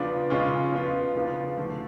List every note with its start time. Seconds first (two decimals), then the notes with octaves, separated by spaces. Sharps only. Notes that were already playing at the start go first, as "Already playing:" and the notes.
Already playing: C#3 F3 B3 D4 F4
0.30 C#3 G#3 C#4 F4
0.72 F3 B3 F4
1.15 C#3 F3 B3 D4 F4
1.57 D3 F3 A3